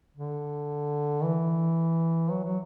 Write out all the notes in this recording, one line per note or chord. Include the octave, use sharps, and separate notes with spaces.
D3
E3
F#3
F#3